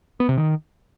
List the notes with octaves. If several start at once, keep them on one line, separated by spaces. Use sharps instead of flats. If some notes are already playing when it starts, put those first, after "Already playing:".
B3
C3
D#3